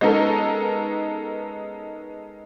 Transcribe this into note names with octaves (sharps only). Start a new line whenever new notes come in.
G#3 B3 C#4 D#4 A4 A#4